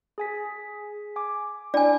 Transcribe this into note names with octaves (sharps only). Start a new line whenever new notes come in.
G#4 G#5 B6
G#5 D6
D4 E4 D5 G5 G#5